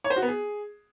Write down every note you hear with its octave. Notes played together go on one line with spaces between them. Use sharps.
C#5
C5
F#4
B3
G#4